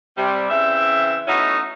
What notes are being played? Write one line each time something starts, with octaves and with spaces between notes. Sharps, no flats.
C3 G3
C#3 E3 C4 E5
A3 B3 C#4 D#4 E4 F#4